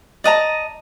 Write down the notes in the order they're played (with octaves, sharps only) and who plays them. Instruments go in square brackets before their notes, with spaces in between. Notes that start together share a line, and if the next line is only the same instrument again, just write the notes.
[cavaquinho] D5 D#5 A5 A#5